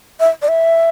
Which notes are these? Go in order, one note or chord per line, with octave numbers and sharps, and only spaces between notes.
E5
D5
E5